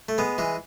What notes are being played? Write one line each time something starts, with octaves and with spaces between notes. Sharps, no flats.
A3
G#3 B3
E3 G#3